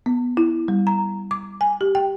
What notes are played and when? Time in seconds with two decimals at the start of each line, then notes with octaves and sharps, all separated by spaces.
0.06 B3
0.37 E4
0.68 G3
0.87 A#5
1.31 D6
1.61 G#5
1.81 G4
1.95 G5